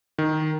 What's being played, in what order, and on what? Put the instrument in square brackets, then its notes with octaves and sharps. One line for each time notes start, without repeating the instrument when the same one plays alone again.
[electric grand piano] D#3